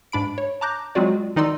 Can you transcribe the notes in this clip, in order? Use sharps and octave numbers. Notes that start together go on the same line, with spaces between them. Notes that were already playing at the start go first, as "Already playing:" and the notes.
G#2 D4 B5 D7
C#5
A5 A#5 D6 F#6 G6 A#6
F#3 G#3 C4 F4 F#4 D5
D#3 D#4 D5 C6 E6